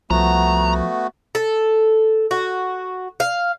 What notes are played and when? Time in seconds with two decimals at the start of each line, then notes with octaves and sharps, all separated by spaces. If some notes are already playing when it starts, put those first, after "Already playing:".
0.11 C2 F3 A3 B3 F#4 A#5
1.35 A4
2.31 F#4
3.20 F5